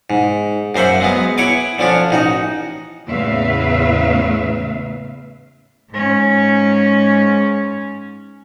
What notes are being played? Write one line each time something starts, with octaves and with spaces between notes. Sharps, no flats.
G#2
F#2 A#3 C5 E5 F#5
F#3 G#3 B3
E4 C#5 F#5 G#5 D6
D3 F3 C#4 D4
A1 D#4 F#4
E2 A2 C#3 B4 E5 F5
G#2 C#4